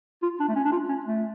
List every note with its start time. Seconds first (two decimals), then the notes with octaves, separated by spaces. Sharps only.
0.23 F4
0.40 D4
0.48 A3
0.56 C#4
0.65 D4
0.72 F4
0.89 C#4
1.06 A3